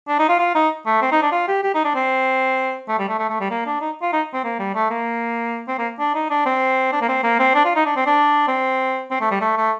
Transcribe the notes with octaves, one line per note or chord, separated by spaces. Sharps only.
D4
D#4
F4
F4
D#4
A3
C4
D#4
D4
F4
G4
G4
D#4
D4
C4
A3
G3
A3
A3
A3
G3
A#3
D4
D#4
F4
D#4
C4
A#3
G3
A3
A#3
C4
A#3
D4
D#4
D4
C4
D4
A#3
C4
A#3
C4
D4
F4
D#4
D4
C4
D4
C4
C4
A3
G3
A3
A3